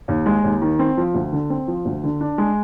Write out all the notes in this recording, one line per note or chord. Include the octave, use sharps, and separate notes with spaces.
D#2
G#3
D#2
D#3
C4
F3
D2
D3
C4
F3
D2
D3
D4
G#3